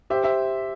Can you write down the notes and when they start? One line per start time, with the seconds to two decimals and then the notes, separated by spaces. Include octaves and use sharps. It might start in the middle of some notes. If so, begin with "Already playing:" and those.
0.10 G4 C5 E5
0.24 C5 E5